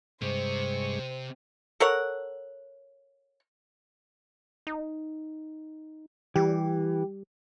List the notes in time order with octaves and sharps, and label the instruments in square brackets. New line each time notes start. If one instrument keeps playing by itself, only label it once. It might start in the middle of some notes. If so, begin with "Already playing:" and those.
[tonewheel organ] G2 G#3 C#6 [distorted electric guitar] C3 [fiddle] C5
[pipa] A4 A#4 C#5 F#5
[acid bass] D#4
[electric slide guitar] E3 [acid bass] G3 [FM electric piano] G4